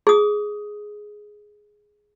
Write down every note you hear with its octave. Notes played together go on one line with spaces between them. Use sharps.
G#4 D#6